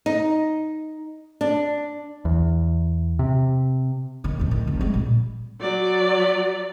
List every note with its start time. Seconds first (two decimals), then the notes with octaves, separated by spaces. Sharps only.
0.06 D#4
1.41 D4
2.25 E2
3.19 C3
4.24 D#1 D#3
4.39 F2 A2
4.51 D#3
4.67 F1
4.81 G3 G#3
4.94 A#2
5.60 F#3 D5